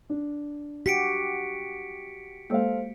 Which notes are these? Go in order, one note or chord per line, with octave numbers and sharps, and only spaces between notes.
D4
F#4 G4 B6 C#7 D7
G#3 A#3 A4 C5 F5